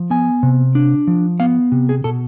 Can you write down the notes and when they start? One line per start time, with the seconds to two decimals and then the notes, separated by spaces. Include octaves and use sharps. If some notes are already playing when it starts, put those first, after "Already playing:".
Already playing: F3
0.10 B3 G#5
0.43 C3
0.75 D4
1.07 F3
1.40 B3 F5
1.72 C3
1.89 G#4
2.04 B2 A4